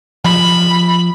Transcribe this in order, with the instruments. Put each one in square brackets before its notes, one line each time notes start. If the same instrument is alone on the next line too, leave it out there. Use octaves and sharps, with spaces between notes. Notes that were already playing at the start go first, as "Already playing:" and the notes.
[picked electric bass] F3 [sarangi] B5